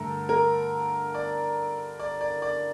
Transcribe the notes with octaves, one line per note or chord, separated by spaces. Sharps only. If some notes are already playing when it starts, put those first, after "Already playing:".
Already playing: G2 D3 A3 A4 A#4
A#4
D5
D5
D5
D5